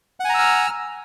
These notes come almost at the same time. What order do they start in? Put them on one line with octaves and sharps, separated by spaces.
F#5 G#5 A#5 E6 F6